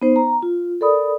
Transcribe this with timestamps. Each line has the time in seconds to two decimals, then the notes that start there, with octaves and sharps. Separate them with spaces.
0.02 B3 D#4 C5
0.16 A#5
0.43 F4
0.81 A4 A#4 D5 B5 D#6